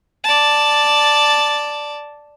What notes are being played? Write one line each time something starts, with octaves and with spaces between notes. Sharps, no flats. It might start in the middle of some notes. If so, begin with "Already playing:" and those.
D5 A5